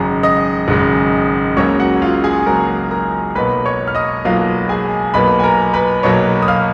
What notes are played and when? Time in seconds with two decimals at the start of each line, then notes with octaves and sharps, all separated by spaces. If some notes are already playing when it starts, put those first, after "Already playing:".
Already playing: G#1 F#2 C#3 G#3 A#5
0.23 D#5 D#6
0.68 G#1 F#2 C#3 G#3
1.57 C#2 C#3 F#3 A#3 C#5 C#6
1.80 F#4 F#5
2.02 F4 F5
2.24 G#4 G#5
2.46 C#2 C#3 F#3 A#3 A#4 A#5
2.91 A#4 A#5
3.35 B1 B2 F#3 A#3 B4 B5
3.66 C#5 C#6
3.88 F6
3.95 D#5 D#6
4.25 B1 B2 F#3 A#3 F4 F5
4.69 G#4 G#5
5.14 B1 B2 F#3 A#3 B4 B5
5.39 G#5
5.44 A#4 A#5
5.74 B4 B5
6.03 B1 B2 F#3 A#3 C#5 C#6
6.42 D#6
6.48 F5 F6